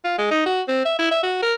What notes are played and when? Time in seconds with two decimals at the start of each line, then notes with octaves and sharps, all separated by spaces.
0.05 F4
0.18 G#3
0.31 D#4
0.46 F#4
0.68 C4
0.85 E5
0.99 E4
1.11 E5
1.23 F#4
1.42 A#4